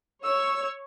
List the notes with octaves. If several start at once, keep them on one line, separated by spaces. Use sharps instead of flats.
C#5 E6